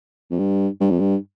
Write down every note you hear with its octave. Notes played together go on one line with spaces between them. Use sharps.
F2
G2
G2
F2
G2